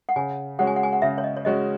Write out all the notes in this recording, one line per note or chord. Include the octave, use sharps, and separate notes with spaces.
F#5
C#3 G#5
G#3 C#4 F#4 F#5
G#5
F#5
G#5
F#5
C#3 E5
C#5
D#5
C#5
G#3 C#4 F#4 D#5